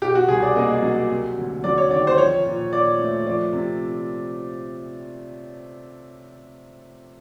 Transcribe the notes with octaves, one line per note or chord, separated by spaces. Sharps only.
B2 G4
F#4
C2 G#4
D5
A#3 D#5
F#3
C3
D2
F#3 D5
C#5
D#3 D5
C5
F3 C#5
A#2
A#2 D5
A3
F3 D5
C3